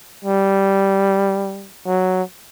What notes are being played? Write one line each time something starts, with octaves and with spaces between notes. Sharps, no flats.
G3
F#3